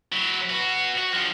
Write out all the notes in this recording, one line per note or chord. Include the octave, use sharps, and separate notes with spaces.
F#3 E4
F#4 B4
F#4
G2 F3